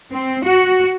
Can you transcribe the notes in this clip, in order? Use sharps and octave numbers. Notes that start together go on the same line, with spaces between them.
C4
F#4